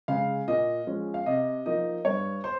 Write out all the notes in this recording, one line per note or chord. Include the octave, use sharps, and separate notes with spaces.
C#3 G#3 F5
A#2 D#5
F3 G#3 C#4
F5
C3 D#5
F3 A#3 D#4 D#5
G2 C#5
C5